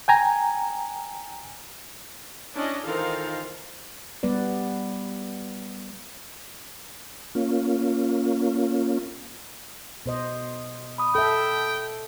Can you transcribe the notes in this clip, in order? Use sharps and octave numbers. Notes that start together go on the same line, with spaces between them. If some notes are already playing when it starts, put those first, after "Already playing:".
G5 G#5 A#5
C#4 D4 E4 D#5
D#3 E3 D#4 F4 A4 A#4 C5 F5
G3 B3 B4 D5
A#3 C#4 F4
B2 C5 D#5
B5 D#6
A4 E5 G5